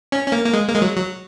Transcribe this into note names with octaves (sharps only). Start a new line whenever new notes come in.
C#4
C#4
A#3
A#3
G#3
A#3
G#3
F#3
F#3